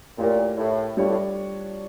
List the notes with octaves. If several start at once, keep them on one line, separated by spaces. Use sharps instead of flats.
A#2 A3 E4 G4 A#4 C#5
A2
G2 G3 D4 F4 A4 C#5
A2